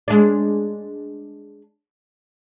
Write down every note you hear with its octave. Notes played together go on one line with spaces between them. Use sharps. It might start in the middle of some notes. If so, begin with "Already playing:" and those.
G#3 D4